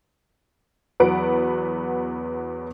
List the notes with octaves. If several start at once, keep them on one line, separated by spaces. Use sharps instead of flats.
E2 F#3 B3 B4 F#5 D7